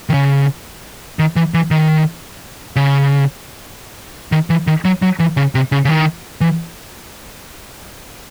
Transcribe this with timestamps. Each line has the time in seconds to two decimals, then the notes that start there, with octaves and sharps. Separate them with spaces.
0.09 D#3
0.14 C#3
1.19 D#3
1.36 E3
1.54 E3
1.71 D#3
2.76 C#3
4.32 D#3
4.50 E3
4.67 D#3
4.85 F#3
5.02 F#3
5.20 E3
5.37 C#3
5.55 C3
5.72 C#3
5.85 C#3
5.89 D#3
6.41 E3